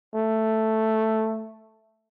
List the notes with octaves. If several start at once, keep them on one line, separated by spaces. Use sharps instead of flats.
A3